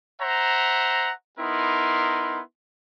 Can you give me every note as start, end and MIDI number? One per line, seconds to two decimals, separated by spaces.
0.21 1.12 72
0.21 1.12 76
0.21 1.12 78
0.21 1.12 82
1.39 2.41 59
1.39 2.41 63
1.39 2.41 64
1.39 2.41 70
1.39 2.41 84